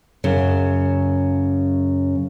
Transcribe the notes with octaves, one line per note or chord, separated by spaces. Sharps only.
F#2 C#3